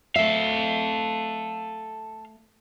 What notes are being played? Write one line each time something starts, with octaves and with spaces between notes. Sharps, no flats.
A3 A4 E5 F5